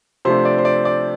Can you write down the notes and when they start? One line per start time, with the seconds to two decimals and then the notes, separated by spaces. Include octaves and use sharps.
0.25 C3 F3 A3 D4 C5
0.45 D5
0.58 C5
0.65 D5
0.85 D5